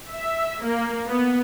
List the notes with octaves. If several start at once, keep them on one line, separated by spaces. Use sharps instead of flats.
E5
A#3
B3